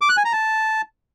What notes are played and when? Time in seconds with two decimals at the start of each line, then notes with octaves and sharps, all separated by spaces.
0.01 D6
0.09 F#6
0.17 G#5
0.25 A#5
0.33 A5